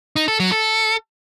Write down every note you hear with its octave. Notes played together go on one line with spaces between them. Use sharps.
D#4
A4
F#3
A4